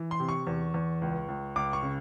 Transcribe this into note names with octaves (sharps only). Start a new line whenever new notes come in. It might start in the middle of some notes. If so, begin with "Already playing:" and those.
Already playing: E3
C6
C3
C#6
E2
E2
C#2
C#2
C#2 D6
C#6
C#3